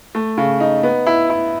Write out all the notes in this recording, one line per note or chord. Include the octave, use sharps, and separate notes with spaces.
A3
C#3
D#4
B3
E4
E4